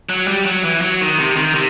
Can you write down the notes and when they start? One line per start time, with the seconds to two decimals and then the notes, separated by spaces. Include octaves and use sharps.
0.09 F#3
0.28 G3
0.45 F#3
0.64 E3
0.82 F#3
1.01 D#3
1.19 C3
1.37 D#3
1.55 C3